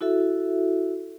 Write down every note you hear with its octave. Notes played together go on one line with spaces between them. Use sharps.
E4 F#4 A4 E5